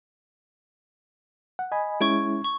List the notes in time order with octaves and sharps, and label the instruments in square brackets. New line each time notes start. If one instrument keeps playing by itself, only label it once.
[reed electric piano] F#5
D#5 G#5 B5
[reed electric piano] G#3 C#4 E4 [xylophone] C#6 G#6 D7
[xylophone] C#6